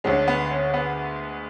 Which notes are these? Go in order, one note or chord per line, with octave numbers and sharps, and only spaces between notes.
D2 D3 G#3 C#4
B3
C#4
B3